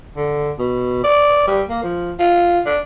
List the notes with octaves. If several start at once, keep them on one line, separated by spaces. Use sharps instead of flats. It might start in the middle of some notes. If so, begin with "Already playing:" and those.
D3
B2
D5
G3
A#3
F3
F4
D4